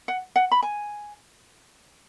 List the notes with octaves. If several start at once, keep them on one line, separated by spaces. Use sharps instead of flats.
F#5
F#5
B5
G#5